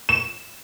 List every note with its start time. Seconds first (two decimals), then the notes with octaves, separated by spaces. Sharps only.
0.09 E7